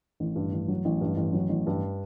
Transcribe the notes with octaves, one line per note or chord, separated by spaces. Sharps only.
A1
G2
A1
F#3
A1
G2
A1
F#3
A1
G2